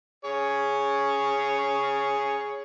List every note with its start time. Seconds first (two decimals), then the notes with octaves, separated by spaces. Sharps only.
0.25 G#4 C#5